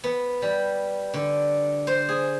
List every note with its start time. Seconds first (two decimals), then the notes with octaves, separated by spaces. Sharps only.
0.04 B3
0.42 G3
1.14 D3
1.87 C5
2.09 G#4